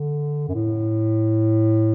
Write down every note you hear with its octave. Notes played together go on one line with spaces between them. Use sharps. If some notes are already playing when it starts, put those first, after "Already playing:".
Already playing: D3
F#2
A2